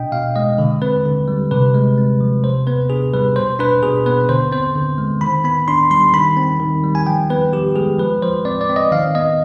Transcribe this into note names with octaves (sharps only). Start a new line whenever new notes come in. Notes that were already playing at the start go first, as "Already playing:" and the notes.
Already playing: B2 D4 D#5 G5
B2 F5
G#3 D#5
D3
C4 B4
D3
G3
C3 B4
G#3
C4
F3
C3 C5
B3 B4
D4 G#4
G3 B4
B2 C5
D4 B4
B2 G#4
B3 B4
D3 C5
C4 C5
D3
G#3
D#3 B5
B3 B5
D4 C6
G3 C6
D#3 B5
C4
D#3
G3
G#5
F3 G5
B3 B4
F3 G4
G#3 G#4
F3 B4
F3 C5
C4 D5
D5
C4
D#5
D#3 F5
B3 D#5